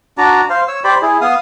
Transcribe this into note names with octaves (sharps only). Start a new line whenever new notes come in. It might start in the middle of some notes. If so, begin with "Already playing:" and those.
D4 F#4 D5 A#5
C5 F5
C#5 E6
G4 C5 D5 B5
E4 G#4
B3 F5 D#6